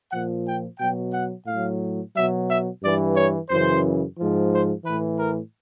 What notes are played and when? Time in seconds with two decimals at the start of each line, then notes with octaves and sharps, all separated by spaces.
0.11 A#2 F3 F#5
0.45 G5
0.78 B2 F#3 G5
1.13 F#5
1.46 A2 F#3 F5
2.14 B2 F#3 E5
2.48 E5
2.82 G2 E3 D5
3.16 C#5
3.49 F#2 C#3 E3 C5
4.18 G#2 F3
4.52 C5
4.85 A2 E3 B4
5.19 A#4